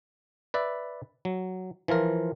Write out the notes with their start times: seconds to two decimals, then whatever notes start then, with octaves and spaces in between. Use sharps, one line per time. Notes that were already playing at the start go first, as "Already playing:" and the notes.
0.54 B4 D5 E5
1.25 F#3
1.88 E3 F3 F4 A#4